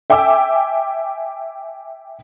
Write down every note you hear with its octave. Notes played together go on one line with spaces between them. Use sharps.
E5 G5 G#5 D6 E6